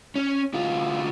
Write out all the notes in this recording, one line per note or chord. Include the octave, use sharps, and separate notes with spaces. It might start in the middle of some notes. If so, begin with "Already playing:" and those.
C#4
D2 F4